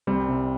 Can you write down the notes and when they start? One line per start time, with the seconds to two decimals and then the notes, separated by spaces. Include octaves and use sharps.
0.07 C2 G3 C4
0.28 C3